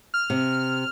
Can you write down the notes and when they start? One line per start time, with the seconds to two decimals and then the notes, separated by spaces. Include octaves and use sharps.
0.14 F6
0.30 C3